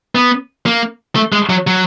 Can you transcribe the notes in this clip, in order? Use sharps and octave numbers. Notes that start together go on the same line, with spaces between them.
B3
A#3
A3
G#3
F#3
F#3